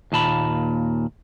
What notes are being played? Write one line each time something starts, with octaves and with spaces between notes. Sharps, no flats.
D#2 A#2 A5 B5